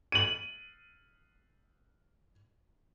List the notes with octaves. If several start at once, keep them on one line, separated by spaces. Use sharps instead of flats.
D#7 F#7